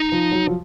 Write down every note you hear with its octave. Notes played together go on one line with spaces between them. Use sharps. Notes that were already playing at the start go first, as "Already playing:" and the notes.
Already playing: D#4
F3
F#3
F3